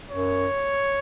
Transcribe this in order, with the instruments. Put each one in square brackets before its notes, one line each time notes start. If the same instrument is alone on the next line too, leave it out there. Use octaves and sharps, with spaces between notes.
[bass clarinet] F#2 [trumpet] C#5